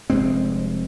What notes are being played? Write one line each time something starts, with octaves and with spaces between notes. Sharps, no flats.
F1 G2 G#3 C4